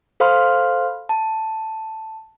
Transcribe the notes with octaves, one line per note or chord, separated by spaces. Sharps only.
A4 C5 F5 B5 C6 F6
A5